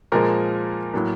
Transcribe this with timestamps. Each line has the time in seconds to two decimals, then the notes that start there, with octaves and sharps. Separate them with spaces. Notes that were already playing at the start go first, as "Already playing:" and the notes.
0.12 A#2 F3 G#3 A#4
0.94 A2 F#3 A#3 A#4